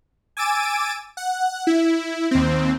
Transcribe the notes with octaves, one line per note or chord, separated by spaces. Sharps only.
G#5 D6 E6 A6 D7 D#7
F#5
E4
D#2 C4